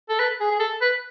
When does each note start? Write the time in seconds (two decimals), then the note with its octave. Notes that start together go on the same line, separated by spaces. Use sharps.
0.09 A4
0.19 B4
0.40 G#4
0.51 G#4
0.60 A4
0.81 B4